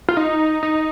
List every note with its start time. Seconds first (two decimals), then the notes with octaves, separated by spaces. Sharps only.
0.09 F4
0.17 D#4
0.63 D#4